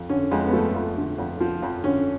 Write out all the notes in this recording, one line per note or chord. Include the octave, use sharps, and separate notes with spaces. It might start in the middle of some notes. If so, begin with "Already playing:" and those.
Already playing: F2
D3 C#4
F2 G#3
B3
F3 A3
F2
D3
F2
F3
F2
D3 C#4